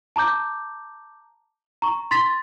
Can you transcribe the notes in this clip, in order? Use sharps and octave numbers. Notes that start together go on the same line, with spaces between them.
A5 A#5 D6 G6
A#5 C#6
C6 A6 B6